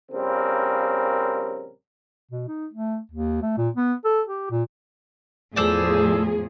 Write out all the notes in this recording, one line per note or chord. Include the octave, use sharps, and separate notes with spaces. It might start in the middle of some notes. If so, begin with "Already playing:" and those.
A#1 C#3 G3 C4 A#4
B2
D#4
A3
D#2
A3
A#2
B3
A4
G4
A#2
E2 A2 F3 G#4 A4 C5 D5